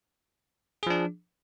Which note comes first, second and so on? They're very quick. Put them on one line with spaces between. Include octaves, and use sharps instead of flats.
G#4 F3 D4